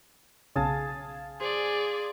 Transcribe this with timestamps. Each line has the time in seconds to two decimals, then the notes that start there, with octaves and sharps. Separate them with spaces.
0.56 B1 C#3 G#4 F5 A5
1.40 G#4 C5 D5